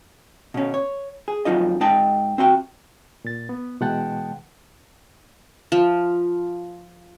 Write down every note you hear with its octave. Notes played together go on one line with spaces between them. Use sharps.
B2 C#4
C#5
G#4
F2 G#2 F#3 D#4 F4 D#5
G#2 D#4 D#5 G5 A5
C4 F#4 G5
A#2 A6
B3
B2 E3 G#3 F#5 G5 A5
F3